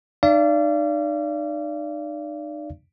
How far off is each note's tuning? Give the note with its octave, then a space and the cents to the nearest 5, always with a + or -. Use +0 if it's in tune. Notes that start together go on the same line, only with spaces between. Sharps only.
D#4 -40 D5 -20 F5 -40